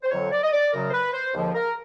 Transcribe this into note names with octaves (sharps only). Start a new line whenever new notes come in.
C5
F2 D3 F#3 C#5
D5
D#5
D5
F#2 C#3 F#3 A#4
C5
B4
C5
D#2 D3 F3 G#3
A#4